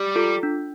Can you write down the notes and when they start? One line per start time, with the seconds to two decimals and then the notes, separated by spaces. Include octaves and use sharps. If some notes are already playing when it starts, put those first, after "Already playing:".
Already playing: G3
0.16 F4 A4
0.43 D4